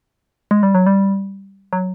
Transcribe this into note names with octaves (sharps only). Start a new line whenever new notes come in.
G#3
G3
F#3
G3
F#3